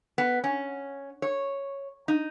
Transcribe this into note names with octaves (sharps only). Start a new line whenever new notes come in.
B3
C#4
C#5
D#4